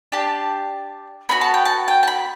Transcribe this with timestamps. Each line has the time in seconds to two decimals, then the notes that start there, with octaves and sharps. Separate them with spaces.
0.12 D4 G4 A5
1.29 B3 D4 F#4 B5
1.41 A5
1.54 G5
1.65 A5
1.88 G5
2.03 A5
2.07 B5